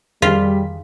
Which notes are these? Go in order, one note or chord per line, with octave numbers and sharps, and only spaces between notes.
F2 D#3 G3 F4 G#4 B6